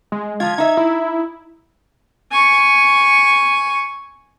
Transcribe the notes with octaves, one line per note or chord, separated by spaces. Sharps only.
G#3
F3 F4 G#6
D#4 E5
E4
G#5 C#6